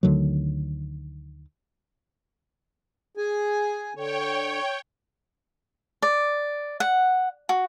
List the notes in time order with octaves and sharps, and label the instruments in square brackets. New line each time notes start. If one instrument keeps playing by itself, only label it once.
[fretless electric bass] D2 D3 D#3 F#3
[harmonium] G#4 G#5
[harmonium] D3 [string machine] C#5 G5
[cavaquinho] D5
F#5
F#4